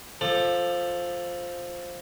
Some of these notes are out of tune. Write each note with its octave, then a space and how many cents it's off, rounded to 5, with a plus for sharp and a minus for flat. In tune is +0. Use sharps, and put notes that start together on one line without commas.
F3 +5 A4 +0 D6 +35